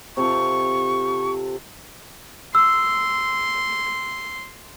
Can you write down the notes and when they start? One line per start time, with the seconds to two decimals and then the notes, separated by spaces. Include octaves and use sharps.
0.17 C3 F4 A4 C#6
2.55 C6 E6